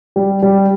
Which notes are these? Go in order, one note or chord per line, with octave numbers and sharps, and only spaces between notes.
G3
G3